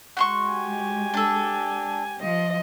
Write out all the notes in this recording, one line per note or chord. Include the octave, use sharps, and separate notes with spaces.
G#3 F#4 C6 C#6
G4 G#5
D4 A4
F3 D#5